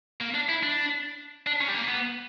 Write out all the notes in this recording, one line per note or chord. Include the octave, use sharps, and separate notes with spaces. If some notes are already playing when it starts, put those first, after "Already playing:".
A#3
D4
E4
D4
D4
C#4
G3
A#3
B3